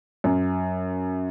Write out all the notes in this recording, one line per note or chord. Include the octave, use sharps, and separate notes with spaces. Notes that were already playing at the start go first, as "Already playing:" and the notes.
F#2